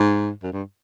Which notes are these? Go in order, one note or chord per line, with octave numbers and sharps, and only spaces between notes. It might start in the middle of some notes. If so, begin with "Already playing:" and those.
Already playing: G#2
F#2
G2